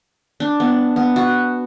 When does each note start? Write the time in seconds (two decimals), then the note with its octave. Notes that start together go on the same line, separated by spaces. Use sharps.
0.40 D4
0.60 B3
0.96 B3
1.16 F#4